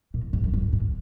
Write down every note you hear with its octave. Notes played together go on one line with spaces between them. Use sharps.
A#2
G#2
F#2
G#2
G#2